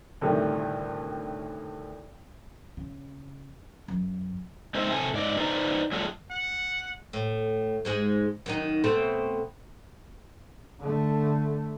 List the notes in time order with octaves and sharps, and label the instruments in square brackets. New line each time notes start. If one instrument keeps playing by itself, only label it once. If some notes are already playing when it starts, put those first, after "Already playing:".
[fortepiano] D2 A2 C3 D#3 G3
[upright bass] C#3
F#2
[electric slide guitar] G#3 C4 D#4 C5 E5
C3 A4 G#5
G#2 D5 D#5
D#4 B4 C5 D5 G5 A#5
F#3 G3 A3 F4 F#4 G#4
[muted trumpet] F#5
[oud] A2
G#2 G#3 G#4
F#2 D#3 D#4
B2 A3 C4
[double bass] D3 A3